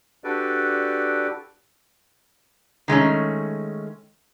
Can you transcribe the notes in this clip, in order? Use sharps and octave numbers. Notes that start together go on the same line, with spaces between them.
D4 F#4 G4 A4 B4 D5
D#3 G#3 A3 C#4